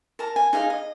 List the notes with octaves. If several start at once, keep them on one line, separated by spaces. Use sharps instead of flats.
A#4 A5 A#5
G#5
D#4 G#4 F5 G#5
D#5